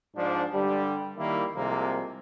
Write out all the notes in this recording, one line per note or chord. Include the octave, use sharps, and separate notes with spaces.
G#2 F3 D4
G2 D3 G3
D#3 G3 A#3 E4
C2 C3 F3 G#3 A#3